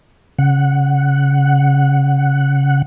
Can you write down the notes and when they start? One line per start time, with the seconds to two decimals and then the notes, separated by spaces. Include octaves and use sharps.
0.39 C#3 F#5